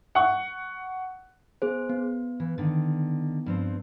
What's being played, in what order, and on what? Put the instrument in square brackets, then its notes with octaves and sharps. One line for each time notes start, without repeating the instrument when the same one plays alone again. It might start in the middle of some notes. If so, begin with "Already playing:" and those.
[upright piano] F#5 C#6
[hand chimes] B3 G#4 C5
B3
[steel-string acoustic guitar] E3
D3 D#3
G2 F3 C4